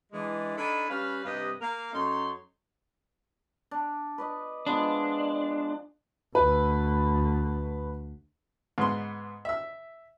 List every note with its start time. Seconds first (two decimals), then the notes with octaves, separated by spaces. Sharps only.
0.12 E3 G#3 D4
0.57 D4 D#4 A4 G#5 B5
0.89 G3 C#4 B4 F5
1.25 G2 C3 G4 B4 D#5
1.61 A#3 A#4 F5
1.93 F#2 C#4 D#4 A4 C#5 C6
3.71 D4
4.18 B4 D5 D#5
4.66 F3 G#3 B3 D4
6.35 D2 B4
8.78 G#2 B3 C6
9.45 E5 E6